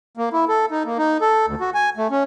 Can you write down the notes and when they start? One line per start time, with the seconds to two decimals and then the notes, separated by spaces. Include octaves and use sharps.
0.17 A#3
0.33 E4
0.48 A4
0.71 D#4
0.86 A#3
0.99 D#4
1.21 A4
1.47 D2
1.61 F#4
1.74 G#5
1.97 A3
2.11 C#4